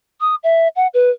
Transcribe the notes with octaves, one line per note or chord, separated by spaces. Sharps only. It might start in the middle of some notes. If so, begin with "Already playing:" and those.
D#6
E5
F#5
B4